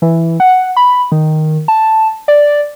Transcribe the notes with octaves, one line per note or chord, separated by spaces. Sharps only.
E3
F#5
B5
D#3
A5
D5